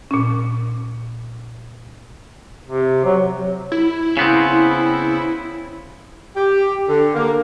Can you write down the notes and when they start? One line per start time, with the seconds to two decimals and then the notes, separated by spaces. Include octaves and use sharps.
0.11 A#2 C#4
2.66 C3
3.05 F#3
3.72 E4
4.17 C#3 B3 C4
6.37 G4
6.88 D3
7.15 A#3